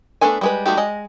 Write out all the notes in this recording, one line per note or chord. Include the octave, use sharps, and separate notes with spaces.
A3 B3 D4 A4 G#5
G3 G#3 B4
G3 A3 D#4 F#4 G4
G#3 D#5